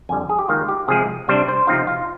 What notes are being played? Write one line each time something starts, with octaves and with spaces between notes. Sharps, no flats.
F2 D3 G3 G#5
G#4
G4
D#2 D#3 G#3 D#4 F4
G4
C3 F3 G#3 G#4
C3 G3 D4 C5
C5
C3 F3 C4 D#4 F4
F4